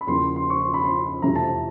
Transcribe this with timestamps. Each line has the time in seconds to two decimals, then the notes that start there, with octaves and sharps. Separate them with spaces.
0.01 B5
0.07 E2 C#3 F3 A#3 C6
0.36 C6
0.50 C#6
0.61 C6
0.74 B5
0.84 C6
1.22 F2 C3 E3 A3 A#5
1.36 A5